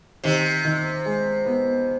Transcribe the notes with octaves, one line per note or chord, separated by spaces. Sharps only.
C3 D#3
D#3
G#3
B3